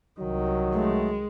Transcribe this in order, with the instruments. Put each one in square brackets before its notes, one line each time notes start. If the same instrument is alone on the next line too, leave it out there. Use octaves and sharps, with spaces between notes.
[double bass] C2 D#3 [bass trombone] F#3
[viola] G#3 [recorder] A3